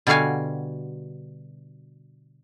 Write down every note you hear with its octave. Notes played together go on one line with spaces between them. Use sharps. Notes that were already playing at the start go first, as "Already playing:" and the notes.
B2 D3 G3 F#4 F5 G#5